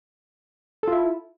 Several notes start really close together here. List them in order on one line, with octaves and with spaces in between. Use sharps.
A4 F4 E5 E4